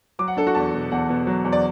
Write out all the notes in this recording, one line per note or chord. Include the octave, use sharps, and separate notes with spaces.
F#3 D6
F#5
D4 A4
F#4
E2 A5
B2
E2 F#5
B2
F#3
E2
D5